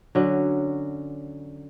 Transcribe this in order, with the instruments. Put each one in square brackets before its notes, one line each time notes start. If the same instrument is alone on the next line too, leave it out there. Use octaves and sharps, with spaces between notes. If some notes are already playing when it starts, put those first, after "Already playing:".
[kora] D3 F#3 C#4